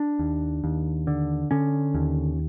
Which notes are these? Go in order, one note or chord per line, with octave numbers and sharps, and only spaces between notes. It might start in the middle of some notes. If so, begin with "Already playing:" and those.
Already playing: D4
D#2
D#2
D3
D3 C#4
D#2